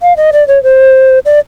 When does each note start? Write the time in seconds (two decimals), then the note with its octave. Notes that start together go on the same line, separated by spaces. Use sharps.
0.02 F5
0.17 D#5
0.33 D5
0.48 C#5
0.63 C5
1.25 D5